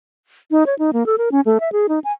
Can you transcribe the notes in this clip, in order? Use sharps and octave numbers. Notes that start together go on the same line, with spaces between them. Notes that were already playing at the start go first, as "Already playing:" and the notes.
D#4
C#5
D#4
A#3
A4
A#4
C#4
A3
E5
G#4
D#4
G#5